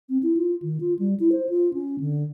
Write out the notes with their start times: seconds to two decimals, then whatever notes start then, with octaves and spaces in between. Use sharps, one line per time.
0.09 C4
0.23 E4
0.37 F4
0.62 D#3
0.80 F4
0.99 G3
1.20 E4
1.32 C5
1.49 F4
1.73 C#4
2.00 D3